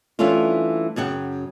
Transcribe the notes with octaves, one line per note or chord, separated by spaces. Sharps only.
E3 G3 A3 C#4 D4 F4
F#2 C#3 F#5 G5